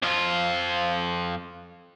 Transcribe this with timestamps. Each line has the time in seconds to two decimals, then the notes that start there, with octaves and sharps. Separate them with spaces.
0.03 F2 F4